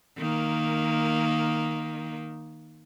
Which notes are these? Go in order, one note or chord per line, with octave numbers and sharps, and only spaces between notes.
D#3 A#3